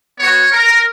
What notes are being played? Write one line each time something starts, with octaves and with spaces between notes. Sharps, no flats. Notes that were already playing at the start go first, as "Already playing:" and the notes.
B3 F#4 C#5
A#4